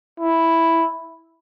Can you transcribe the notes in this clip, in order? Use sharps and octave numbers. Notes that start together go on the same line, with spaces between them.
E4